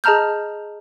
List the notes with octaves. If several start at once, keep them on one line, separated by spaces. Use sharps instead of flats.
G#4 D#5 A5 A#5 F6 G6